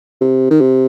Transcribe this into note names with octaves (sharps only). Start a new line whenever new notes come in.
C3
D#3
C3